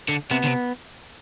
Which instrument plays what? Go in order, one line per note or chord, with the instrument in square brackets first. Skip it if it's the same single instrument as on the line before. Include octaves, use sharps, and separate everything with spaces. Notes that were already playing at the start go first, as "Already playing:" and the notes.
[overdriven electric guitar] D3
[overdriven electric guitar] C3 [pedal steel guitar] B3
[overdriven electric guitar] D3
C3